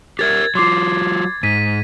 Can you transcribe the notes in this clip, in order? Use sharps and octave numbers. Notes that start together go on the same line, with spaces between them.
G4 A#4 E5 G#6 A6
F#3 F4 C6 D6 C7
G#2 B6 D#7